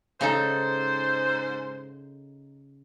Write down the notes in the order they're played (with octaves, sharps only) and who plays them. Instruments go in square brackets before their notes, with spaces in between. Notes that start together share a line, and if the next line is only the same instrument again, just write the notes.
[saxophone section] G#2 C5 [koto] C#3 D#4 A4